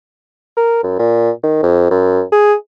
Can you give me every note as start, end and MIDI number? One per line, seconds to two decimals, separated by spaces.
0.57 0.79 70
0.83 0.95 42
0.98 1.30 46
1.43 1.58 51
1.62 1.88 41
1.91 2.22 42
2.32 2.54 68